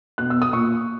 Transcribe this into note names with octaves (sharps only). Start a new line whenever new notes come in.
B2 F#6
E6
D#6
A#2 C#6